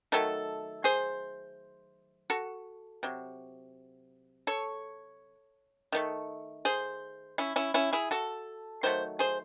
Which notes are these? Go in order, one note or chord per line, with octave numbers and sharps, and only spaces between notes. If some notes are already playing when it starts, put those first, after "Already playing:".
D#3 F#3 A3 A4
G#4 C5
F#4 A4
C3 F#3
A4 C#5
D#3 F#3 A3
G#4 C5
C#4 E4
C#4 E4
C#4 E4
E4 G#4
F#4 A4
D#3 F#3 A3 C5
G#4 C5